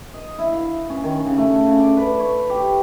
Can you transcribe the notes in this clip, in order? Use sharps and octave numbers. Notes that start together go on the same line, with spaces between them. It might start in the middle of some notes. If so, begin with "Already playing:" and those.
D#5
E4
F5
C#4
D#3
C#3
A3
C#3
D5
B4
C#5
G4